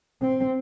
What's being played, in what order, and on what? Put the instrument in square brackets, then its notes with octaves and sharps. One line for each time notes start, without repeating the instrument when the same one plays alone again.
[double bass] C4